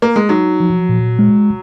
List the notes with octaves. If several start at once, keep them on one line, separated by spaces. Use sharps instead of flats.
A#3
G#3
F#3 D#4
F3
A#2
G#3